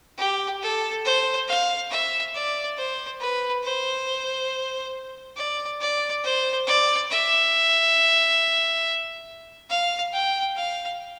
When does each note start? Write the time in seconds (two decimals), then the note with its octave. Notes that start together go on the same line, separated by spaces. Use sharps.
0.18 G4
0.62 A4
1.05 C5
1.48 F5
1.91 E5
2.35 D5
2.77 C5
3.20 B4
3.64 C5
5.37 D5
5.81 D5
6.24 C5
6.67 D5
7.10 E5
9.70 F5
10.13 G5
10.57 F5